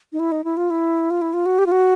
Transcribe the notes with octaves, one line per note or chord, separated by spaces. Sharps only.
D#4
E4
D#4
E4
F4
E4
F4
E4
F4
F#4
G4
F4
F#4